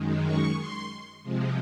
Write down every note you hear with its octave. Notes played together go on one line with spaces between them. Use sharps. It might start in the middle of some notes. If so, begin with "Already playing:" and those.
Already playing: F#2 D#3 G#3
C#6
C6
C3 F3 G#3